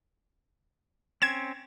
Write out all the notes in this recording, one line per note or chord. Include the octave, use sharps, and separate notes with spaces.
C4 C#4 G#6 E7